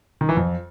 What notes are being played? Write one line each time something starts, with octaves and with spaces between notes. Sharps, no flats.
D#3
E3
F2